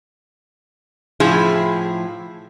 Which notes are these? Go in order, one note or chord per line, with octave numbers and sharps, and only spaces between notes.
A2 F3 E4 G#4